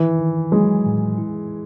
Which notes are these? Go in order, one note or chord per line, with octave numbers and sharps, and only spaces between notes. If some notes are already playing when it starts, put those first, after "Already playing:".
Already playing: D#3 E3
D#3
F#3 G#3
A2
E4